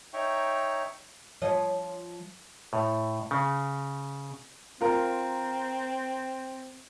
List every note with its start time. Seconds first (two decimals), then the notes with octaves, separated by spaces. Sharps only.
0.13 D#4 C#5 E5 G5 A#5 C#6
1.42 F3 C#5 D#5
2.73 A2
3.31 C#3
4.81 C4 F4 A#4